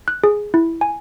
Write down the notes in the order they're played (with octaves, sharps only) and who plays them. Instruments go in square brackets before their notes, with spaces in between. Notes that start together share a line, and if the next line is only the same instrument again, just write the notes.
[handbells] F#6
G#4
E4
G#5